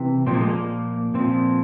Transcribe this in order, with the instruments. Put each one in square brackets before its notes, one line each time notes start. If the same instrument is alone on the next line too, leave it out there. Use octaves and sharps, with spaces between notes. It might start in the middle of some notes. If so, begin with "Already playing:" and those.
Already playing: [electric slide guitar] C3 E3
A#2 F3 C4
A#3
G#3
A#3
A#2 F3 C4